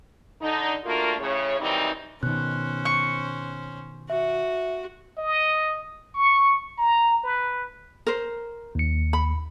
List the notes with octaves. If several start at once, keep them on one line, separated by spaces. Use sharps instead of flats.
D3 D#4
A3 A#3 D4 F4 F#4 A#4
A2 C#3 C#5
D#3 E3 F#3 G3 C4 D#4
B2 D#3 C#4 C5 F#6
C#6
F#4 E5
D#5
C#6
A#5
B4
A#4 C5
D#2 C#7
B5